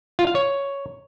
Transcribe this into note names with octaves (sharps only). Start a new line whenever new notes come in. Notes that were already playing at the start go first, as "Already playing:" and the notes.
F4
F5
C#5